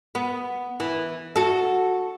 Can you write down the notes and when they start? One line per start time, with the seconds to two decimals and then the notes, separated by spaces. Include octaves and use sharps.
0.15 B3
0.80 E3
1.36 F#4 A4